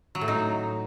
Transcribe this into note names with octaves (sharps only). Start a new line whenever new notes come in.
F#3
A2
D#4